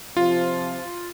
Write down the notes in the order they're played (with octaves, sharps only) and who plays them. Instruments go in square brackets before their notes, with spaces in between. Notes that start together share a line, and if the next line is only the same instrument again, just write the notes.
[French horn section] C3 F3 [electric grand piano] F4